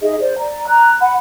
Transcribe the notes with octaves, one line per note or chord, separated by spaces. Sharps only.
D#4 G#4 D#5 E5
C5 D5
D5 A#5
A#5 F#6
F#5 B5